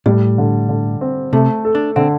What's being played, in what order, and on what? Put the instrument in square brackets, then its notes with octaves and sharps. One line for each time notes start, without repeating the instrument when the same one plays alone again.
[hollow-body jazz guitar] A2 [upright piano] G3
[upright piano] D3
D3
C4
[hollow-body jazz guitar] C3 [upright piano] A3
[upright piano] A4
[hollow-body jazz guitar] D4
[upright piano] D3 [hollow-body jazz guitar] C4